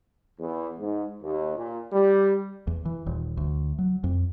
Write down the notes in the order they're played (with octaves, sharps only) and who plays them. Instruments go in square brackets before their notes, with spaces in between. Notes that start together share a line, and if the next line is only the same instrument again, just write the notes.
[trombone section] E2
G#2
D#2
A#2
G3
[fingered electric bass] E2
E3
D#1
D2
F#3
F2